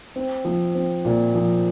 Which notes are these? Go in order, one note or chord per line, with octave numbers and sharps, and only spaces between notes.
C4
F3
C4
A#2
F3